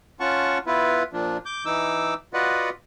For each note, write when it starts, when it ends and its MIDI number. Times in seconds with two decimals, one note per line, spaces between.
0.20 0.58 61
0.20 0.58 65
0.20 0.58 78
0.20 0.58 81
0.20 0.58 85
0.67 1.03 59
0.67 1.03 64
0.67 1.03 65
0.67 1.03 71
1.13 1.37 46
1.13 1.37 53
1.13 1.37 62
1.46 1.65 86
1.46 1.65 91
1.65 2.14 52
1.65 2.14 63
1.65 2.14 86
1.65 2.14 88
2.34 2.70 65
2.34 2.70 66
2.34 2.70 71
2.34 2.70 74
2.34 2.70 75
2.34 2.70 78